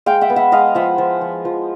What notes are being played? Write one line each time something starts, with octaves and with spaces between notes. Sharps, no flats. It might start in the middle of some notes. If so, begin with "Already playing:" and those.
G#3 F5 G5
E5 F#5
B3
E5 F#5
G#3 D#5 F5
F3 E5 F#5
F3
F3
F3